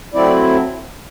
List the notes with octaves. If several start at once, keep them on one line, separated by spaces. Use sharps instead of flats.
F#3 A3 C4 E4 D5